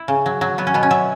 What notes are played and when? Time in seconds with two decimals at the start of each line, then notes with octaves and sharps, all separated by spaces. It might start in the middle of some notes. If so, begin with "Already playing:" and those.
Already playing: E4
0.08 C#3
0.26 F#3
0.41 F#3
0.58 F#3 B3
0.67 C#4
0.74 B2 B3
0.83 C#4
0.91 F#3 E5